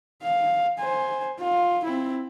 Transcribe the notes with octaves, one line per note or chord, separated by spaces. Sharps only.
F5
C5 G#5
F4
C4 E4